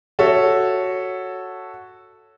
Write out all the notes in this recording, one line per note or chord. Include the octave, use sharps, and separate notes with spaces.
F#4 A4 C#5 E5